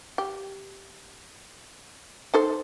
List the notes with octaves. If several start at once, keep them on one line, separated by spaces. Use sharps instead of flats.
G4
D#4 A4 C5